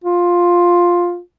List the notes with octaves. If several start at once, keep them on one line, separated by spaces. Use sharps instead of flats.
F4